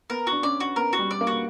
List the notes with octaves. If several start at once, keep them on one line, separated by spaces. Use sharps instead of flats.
B3 A#4
F#4
D4
C#4 D5
F#4
B3 A#4
F#4
G3
D5
A#3
F#4